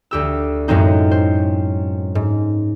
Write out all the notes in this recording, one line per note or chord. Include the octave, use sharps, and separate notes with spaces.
D2 G4 E6
F#2 A2 F#3 G#3 C4 D#4
C5
G#2